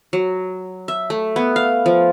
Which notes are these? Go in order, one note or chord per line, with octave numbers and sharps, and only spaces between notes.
F#3
E5
A3
B3
F5
F3